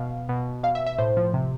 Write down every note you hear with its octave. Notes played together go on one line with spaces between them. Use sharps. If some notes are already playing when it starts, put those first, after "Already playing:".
Already playing: B2 F5
B2
B2 F5
E5
E5
A2 C5
F3
C3